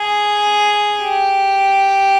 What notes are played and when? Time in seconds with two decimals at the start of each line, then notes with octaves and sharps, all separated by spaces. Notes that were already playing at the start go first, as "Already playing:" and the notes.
Already playing: G#4
1.02 G4